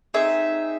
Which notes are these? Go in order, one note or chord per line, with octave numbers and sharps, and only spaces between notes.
C4 D#4 G#4 E5